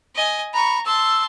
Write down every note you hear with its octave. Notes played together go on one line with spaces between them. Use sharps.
D#5 G#5
A#5 B5 C#6
A5 C6 E6